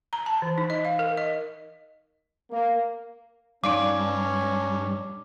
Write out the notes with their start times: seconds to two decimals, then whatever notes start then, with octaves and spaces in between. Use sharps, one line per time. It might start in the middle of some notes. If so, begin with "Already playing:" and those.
0.13 A#5
0.26 A5
0.42 E3
0.58 D#4
0.70 D#5
0.85 F5
0.99 A#4
1.17 D#5
2.50 A#3
3.64 G2 C#4 D#4 D5 F5 D6